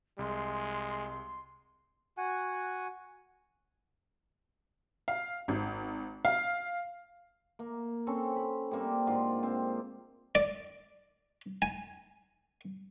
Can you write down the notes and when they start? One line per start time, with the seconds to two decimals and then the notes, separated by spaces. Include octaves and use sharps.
0.19 C2 G#3 C6
2.17 F#4 F#5 G#5
5.08 F5
5.48 G#1
6.25 F5
7.59 A#3
8.07 C4 C#4 A4
8.36 B5
8.71 G3 A#3 C4 G4
9.07 G#2 D3 F4 D5
9.43 C4
10.35 D5
11.62 G#5